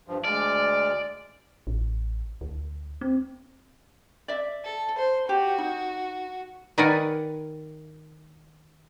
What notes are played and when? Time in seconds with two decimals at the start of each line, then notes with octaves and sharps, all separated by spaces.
0.08 G2 F3
0.25 D2 G#3 D5 F6
1.67 A1
2.41 D2
3.01 C4
4.28 D5 E5
4.64 A4
4.98 C5
5.29 F#4 G4
5.58 D#4
6.78 D#3 A#4 B4 D5 F#5 G#5